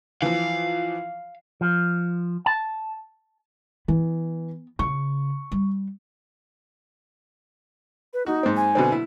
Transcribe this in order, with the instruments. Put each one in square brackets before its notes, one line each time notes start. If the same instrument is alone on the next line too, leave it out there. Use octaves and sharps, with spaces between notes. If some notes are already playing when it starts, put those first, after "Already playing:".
[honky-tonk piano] E3 F3 [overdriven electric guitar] F5
[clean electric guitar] F3
A5
[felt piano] E3 [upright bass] B3
[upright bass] C#3 [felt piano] C#6
[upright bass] G3
[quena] B4
[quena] D#4 [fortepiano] F#4
[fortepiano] G#2 C4
[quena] G#5
[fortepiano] B2 D3 C4
E4